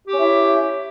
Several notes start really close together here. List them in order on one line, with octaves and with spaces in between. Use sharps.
G4 C#4 E4 E5